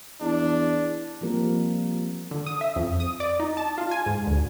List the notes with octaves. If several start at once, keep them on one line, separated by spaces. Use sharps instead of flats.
E2 D4
F3 G3 A#3 C4 G4 A#4
D3
D#6
E5
F2
D#6
D5
D#4
A5
F4
G#5
G#2
D2